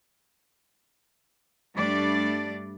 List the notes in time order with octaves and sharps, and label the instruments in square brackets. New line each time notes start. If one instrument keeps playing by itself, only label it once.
[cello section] G2 G3 A3 D4 D5